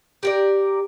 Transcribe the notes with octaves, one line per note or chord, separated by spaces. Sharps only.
G4 A#4 D5